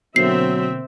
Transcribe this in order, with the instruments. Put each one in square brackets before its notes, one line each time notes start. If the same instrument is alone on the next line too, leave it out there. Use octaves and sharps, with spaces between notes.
[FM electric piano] B2 D3 A#3 [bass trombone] F#3 [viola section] C4 E5 [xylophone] C7